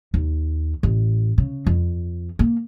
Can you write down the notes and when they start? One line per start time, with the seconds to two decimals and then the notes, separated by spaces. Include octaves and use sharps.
0.14 D#2
0.83 A1
1.38 C#3
1.67 F2
2.39 A#3